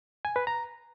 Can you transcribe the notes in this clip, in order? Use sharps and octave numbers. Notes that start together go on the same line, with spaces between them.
G#5
B4
A#5